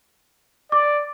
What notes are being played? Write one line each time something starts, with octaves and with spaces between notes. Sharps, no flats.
D5 D6